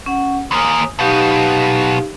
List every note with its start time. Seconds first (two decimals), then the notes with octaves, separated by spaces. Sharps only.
0.06 C#4 F#5
0.51 D#2 A#3 G#5 D#6
0.99 B2 F#3 D#4 G4 F5